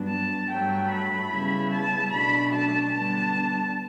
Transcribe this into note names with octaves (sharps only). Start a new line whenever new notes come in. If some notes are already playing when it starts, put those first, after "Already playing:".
Already playing: G2 F#3 B3 D4
A5
G2 F#3 A3 G5
B5
C#3 G3 B3 E4
A5
B2 F#3 A3 D4 B5
A5
D3 G3 B3 D4 A5